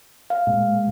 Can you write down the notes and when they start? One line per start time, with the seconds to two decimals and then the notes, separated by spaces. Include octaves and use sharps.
0.30 F5
0.47 A#2 G#3